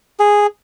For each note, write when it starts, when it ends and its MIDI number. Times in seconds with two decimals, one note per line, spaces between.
0.19 0.47 68